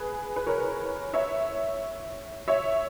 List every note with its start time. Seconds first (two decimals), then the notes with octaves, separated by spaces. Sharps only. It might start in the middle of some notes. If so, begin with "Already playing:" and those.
Already playing: G#4 B4
0.36 B4
0.46 A#4 C#5
1.14 C#5 E5
2.48 C#5 E5